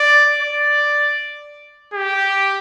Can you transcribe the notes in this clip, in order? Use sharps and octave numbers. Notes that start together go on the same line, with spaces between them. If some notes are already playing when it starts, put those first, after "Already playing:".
Already playing: D5
D5
G4